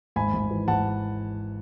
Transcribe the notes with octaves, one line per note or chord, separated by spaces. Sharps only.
G#1 G#5 B5
G#1
E3
G#1 F#5 A5